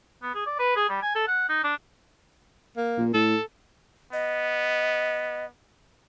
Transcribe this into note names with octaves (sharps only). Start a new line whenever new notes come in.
B3
G#4
D5
B4
G#4
G3
G#5
A4
F#5
D#4
D4
A#3
A#2
A2 A4
B3 D#5